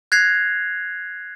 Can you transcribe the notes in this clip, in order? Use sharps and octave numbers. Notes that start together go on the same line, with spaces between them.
F#6 G#6 A#6 C7 F7